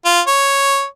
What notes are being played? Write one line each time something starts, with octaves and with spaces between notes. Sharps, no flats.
F4
C#5